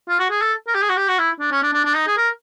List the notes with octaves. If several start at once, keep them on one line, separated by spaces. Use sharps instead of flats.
F4
F#4
G#4
A4
A#4
G4
G#4
F#4
G4
F#4
E4
D4
C#4
D4
D4
D4
D#4
G#4
A#4